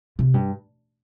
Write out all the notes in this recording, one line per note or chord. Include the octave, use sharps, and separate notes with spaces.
C3
G2